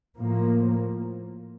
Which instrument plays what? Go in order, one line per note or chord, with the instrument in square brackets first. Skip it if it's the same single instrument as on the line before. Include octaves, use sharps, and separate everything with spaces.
[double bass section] A2 F3 A#3